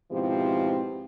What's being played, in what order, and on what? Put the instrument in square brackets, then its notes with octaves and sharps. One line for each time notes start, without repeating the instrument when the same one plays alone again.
[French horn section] G#2 B2 F3 C4 E4 G4